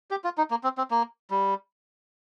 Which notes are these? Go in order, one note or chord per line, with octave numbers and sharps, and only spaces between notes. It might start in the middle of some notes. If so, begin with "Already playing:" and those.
G4
F4
D#4
A#3
C4
C4
A#3
G3